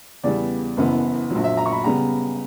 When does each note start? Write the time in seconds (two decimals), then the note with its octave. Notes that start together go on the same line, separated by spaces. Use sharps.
0.24 E2 C#3 G3 B3 D5
0.77 F#1 F#2 E3 B3
1.31 A#1 A#2 F#3
1.44 E5
1.57 A#5
1.66 C#6
1.71 B5
1.84 C#3 G3 B3 A#5